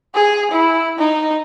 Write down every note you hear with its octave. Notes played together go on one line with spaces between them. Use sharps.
G#4
E4
D#4